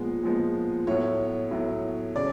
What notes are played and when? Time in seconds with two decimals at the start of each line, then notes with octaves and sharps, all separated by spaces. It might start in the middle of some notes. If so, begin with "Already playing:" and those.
Already playing: A#2 F3 G#3 B3
0.23 A#2 F3 G#3 B3
0.87 A2 F#3 B3 C#5
1.51 A2 F#3 B3
2.16 C#3 D5